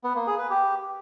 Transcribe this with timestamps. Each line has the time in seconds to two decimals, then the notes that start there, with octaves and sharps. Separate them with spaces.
0.04 B3
0.15 A#3
0.27 G#4
0.38 B4
0.50 G4